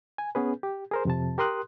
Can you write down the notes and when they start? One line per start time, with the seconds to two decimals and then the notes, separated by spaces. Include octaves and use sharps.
0.18 G#5
0.35 B3 C#4 G#4 B4
0.63 G4
0.91 G#4 A#4 C5
1.05 F2 C3 A5
1.38 G4 A#4 C6 D#6 F#6